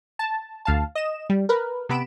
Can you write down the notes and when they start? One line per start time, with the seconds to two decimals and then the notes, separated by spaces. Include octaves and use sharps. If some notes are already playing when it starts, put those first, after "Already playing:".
0.19 A5
0.65 D2 F5 A5
0.95 D#5 E7
1.30 G3
1.49 A#4 B4
1.89 C3 B3 B5 D7 E7